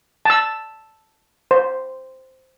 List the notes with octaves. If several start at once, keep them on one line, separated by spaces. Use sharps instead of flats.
A5 E6
C5